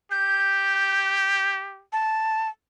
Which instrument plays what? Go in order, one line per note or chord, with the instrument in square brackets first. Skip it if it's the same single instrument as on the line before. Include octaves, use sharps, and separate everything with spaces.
[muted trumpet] G4 [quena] G6
[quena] A5